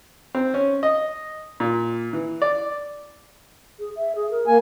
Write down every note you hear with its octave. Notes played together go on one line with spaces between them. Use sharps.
C4
C#4
D#5
A#2
E3
D5
G#4
E5
G#4
A#4
A#3 G#5